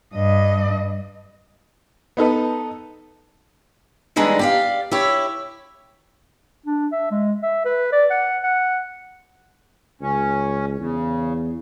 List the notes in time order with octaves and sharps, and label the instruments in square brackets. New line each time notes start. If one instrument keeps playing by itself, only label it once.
[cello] G2 D#5
[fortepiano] B3 D#4 A4 B4
[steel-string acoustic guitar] D3 E3 G3 G#3 D4 D#4
G4 D5 F5
E4 G4 C#5
[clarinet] D4
E5
G#3
E5
B4
D5
F#5
F#5
[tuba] C#2 [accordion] C#4
[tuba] E2 [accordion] C#3